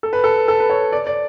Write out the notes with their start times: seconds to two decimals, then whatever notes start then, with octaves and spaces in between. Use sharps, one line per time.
0.03 A4
0.13 B4
0.24 A4
0.48 A4
0.60 B4
0.70 C#5
0.93 D5
1.07 D5